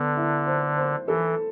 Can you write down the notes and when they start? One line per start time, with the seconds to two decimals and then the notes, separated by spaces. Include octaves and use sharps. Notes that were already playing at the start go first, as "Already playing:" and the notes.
Already playing: D3 B3
0.17 E4
0.47 C5
0.77 C5
1.07 E3 A4